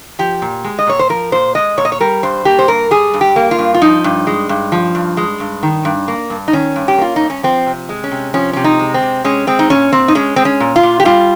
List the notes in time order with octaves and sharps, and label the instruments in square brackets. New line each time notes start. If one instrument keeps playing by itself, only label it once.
[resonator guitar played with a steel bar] F3 G4
A#2
G#3
D#5
A#2 C#5
C5
F3 A#4
A#2 C5
G#3 D#5
A#2 C#5
D#5
C#5
G3 A#4
G2 C5
A#3 G4
C5
G2 A#4
G3 G#4
G2
G4
A#3
F4
G2
F4
F3 D#4
G2
G#3
G2
F3
G2
G#3
G2
D#3
G2
A#3
G2
D#4
D#3 C#4
G2
G4
A#3 F4
G2 D#4
C#4
F3 C4
C3
G#3
C#4
C3
F3 C#4
C3 C#4
D#4
G#3
C4
C3
G#3 C#4
G#3 C4
D#4
A#2 C#4
A#2 C4
D#4
G#3 C#4
G#3 C4
C#4
A#2
F4
A#2
G4
G3 F4